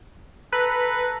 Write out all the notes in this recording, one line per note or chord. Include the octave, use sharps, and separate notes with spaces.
A4 B4 A#5